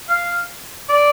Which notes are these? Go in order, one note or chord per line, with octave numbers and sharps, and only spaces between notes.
F5
D5